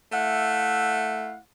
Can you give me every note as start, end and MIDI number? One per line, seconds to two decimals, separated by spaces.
0.13 1.37 57
0.13 1.37 64
0.13 1.37 77
0.13 1.37 78